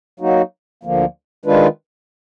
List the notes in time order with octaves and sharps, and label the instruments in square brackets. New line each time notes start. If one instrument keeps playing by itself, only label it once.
[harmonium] F#3 A#3 D#4 F#4
D2 D3 F3 A#3
D#3 G#3 D4 F4 B4